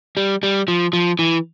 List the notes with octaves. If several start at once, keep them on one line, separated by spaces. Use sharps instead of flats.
G3
G3
F3
F3
E3